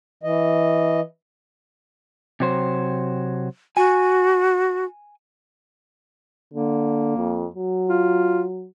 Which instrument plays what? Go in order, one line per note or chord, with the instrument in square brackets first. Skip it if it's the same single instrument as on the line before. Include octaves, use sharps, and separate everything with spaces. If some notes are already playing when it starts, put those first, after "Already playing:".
[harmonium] E3 D#5
[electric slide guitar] C3 F#3 C5
[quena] F#4 [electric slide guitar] G#5
[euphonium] D3 [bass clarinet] A#3
[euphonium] F2
F#3
[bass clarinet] F4